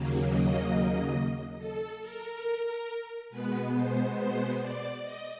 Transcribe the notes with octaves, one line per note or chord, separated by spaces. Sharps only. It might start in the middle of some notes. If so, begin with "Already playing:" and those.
Already playing: D#2 C#3 F#3 A#3
D#5
A4
A#4
B2 G#3 B3 B4
C5
C5
D5
D#5